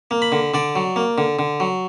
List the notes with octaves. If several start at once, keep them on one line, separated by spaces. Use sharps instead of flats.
A#3
B5
D3
D3 D5
F#3
A#3
D3
D3
F#3